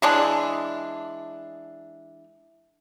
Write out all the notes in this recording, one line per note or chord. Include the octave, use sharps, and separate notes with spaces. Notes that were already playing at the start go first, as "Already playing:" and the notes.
E3 G#3 D4